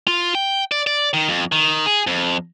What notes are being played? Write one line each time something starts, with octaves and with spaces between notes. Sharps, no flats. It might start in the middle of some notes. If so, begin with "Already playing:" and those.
F4
G5
D5
D5
D#3
F2
D#3
G#4
F2